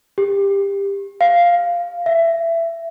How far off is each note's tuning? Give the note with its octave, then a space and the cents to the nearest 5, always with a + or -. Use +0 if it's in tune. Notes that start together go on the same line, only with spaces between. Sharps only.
G4 +20
F5 +0
E5 +20